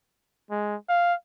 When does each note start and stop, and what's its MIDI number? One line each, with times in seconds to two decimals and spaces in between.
0.51 0.76 56
0.89 1.14 77